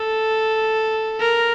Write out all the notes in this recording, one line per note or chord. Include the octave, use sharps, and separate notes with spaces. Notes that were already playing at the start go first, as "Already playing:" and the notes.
Already playing: A4
A#4